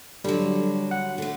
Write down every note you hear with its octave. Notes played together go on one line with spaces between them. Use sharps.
D3 F#3 G3
F#5
D3 A3